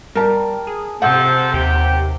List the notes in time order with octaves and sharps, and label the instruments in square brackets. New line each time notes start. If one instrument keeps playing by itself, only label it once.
[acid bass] G3 [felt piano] A#4 A5
[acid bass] G#4
[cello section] C3 [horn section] F3 A4 C5 [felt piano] F#5
[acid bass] D#2 [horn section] G4